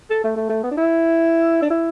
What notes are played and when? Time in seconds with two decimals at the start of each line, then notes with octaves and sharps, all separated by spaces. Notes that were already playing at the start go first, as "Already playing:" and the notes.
0.10 A4
0.24 A3
0.36 A3
0.49 A3
0.64 B3
0.71 D4
0.77 E4
1.62 D4
1.70 E4